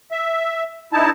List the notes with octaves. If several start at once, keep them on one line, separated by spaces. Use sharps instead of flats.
E5
G2 D#4 E4 A5